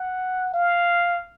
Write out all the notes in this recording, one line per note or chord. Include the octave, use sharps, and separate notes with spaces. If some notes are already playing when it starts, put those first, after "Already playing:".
Already playing: F#5
F5